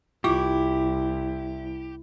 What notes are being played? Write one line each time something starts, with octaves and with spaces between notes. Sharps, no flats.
C2 E4 F4 G4 D6